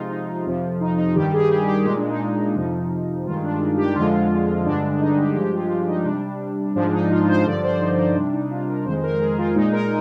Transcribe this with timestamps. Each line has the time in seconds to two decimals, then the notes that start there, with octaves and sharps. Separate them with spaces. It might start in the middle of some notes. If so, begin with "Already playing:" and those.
Already playing: C3 F3 G#3 D#4 F4
0.10 D#4
0.28 F4
0.45 F2 C3 F3
0.80 D#4
0.98 D#4
1.15 G2 D#3 G3 G4
1.33 G#4
1.51 G4
1.68 G4
1.85 A#2 G#3 G4
1.97 D4
2.09 D#4
2.56 F2 C3 F3 D#4
3.26 G2 D#3 G#3 F4
3.43 D4
3.60 D#4
3.77 G4
3.96 F2 D3 F3 G#3 F4
4.65 G2 D3 G#3 D4
5.00 D#4
5.18 G4
5.35 G2 F3 G#3 G4
5.53 F4
5.70 D4
5.87 D#4
6.05 C3 G3 D4
6.75 G#2 F3 G#3 D4
6.93 D#4
7.10 F4
7.28 C5
7.45 G2 D3 F3 D5
7.63 C5
7.80 D#4
7.98 D#4
8.15 C3 G3 D4
8.33 D#4
8.50 F4
8.68 A#4
8.85 F2 D#3 G#3 C5
9.03 A#4
9.21 G#4
9.38 F4
9.55 A#2 G#3 D#4
9.73 A#4